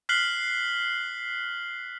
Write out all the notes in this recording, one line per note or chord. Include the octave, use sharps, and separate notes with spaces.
F6 F#6 B6 C7 F#7 G7